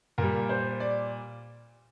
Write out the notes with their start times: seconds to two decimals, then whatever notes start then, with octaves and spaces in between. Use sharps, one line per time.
0.18 A#2 G3 A#4
0.49 C5
0.80 D5